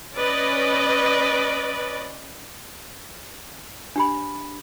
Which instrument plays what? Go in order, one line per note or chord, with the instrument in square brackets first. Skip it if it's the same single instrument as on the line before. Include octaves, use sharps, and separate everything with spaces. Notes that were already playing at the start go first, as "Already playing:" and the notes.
[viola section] C#4 B4 D5 D#5
[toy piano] D4 G4 B5